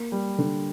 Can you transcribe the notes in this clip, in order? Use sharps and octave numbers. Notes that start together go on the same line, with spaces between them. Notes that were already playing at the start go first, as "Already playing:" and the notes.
Already playing: A#3
G3
D3